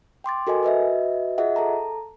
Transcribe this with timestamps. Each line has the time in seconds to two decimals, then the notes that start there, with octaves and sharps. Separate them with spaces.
0.24 G5 C6 D6 A6
0.47 F#4 A4 A#4 D#5 G#5
0.63 F#4 B4 D#5 E5
1.38 F4 G#4 D#5 E5 F#5
1.56 A4 A5 A#5